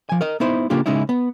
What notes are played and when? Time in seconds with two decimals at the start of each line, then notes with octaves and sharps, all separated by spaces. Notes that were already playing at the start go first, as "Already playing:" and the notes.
0.09 F3 G#5
0.21 A#4 D#5
0.40 B3 D#4 E4 C5
0.70 C#3 A#3 D4 F4 G4
0.86 C#3 G#3 C#4 D#4 E4
1.09 B3